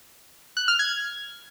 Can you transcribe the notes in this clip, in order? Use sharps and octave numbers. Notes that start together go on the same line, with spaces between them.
F#6
F6
G#6